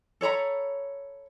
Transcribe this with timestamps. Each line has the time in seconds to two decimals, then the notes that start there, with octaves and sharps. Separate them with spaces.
0.21 A4 C#5 A#5 B5